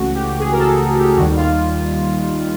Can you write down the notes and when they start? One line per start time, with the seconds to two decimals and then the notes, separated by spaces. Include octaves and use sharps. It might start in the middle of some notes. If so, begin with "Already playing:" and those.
Already playing: C#2 C#3 E3 A3 F#4
0.14 G4
0.39 G#4
0.52 A#4
0.59 A4
0.98 G4
1.16 D#2 D#3 G3 F#4
1.36 F4